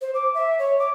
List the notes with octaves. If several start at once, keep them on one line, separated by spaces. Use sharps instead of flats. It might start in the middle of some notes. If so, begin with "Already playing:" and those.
C5
D6
E5
C#5
D6